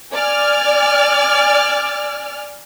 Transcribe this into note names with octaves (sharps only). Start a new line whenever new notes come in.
D5 G#5 F6